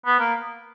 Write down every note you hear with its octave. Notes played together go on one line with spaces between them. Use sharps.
B3
A#3